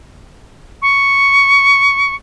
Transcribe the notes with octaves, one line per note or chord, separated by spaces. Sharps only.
C#6